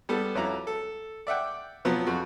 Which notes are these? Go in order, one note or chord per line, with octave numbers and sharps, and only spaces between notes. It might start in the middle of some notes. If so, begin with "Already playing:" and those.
G3 B3 A4
F2 C#4 E4 F#4 A#5 D6
A4
D5 E5 F#5 G5
C3 F3 F#3 B3
F2 F#4